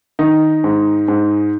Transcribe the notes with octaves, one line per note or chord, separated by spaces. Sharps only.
D#3 D#4
G#2
G#2